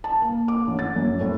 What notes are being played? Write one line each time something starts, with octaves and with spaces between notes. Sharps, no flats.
A5
A#3
D6
A1
A6
F#2
A2